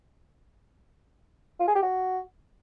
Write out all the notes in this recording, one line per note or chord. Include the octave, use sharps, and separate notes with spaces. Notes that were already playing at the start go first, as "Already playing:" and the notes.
F4
G#4
G4
F#4